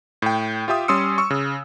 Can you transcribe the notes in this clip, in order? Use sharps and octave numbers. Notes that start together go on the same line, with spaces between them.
A2 G5
F4 G4 E5 G5 D#6
G3 C#4 C6 D#6 E6 C#7
C#6 E6
C#3